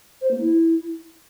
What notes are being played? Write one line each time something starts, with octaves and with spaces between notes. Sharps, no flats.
C5
A#3
E4